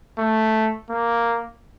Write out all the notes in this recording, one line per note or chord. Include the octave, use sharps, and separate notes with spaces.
A3
A#3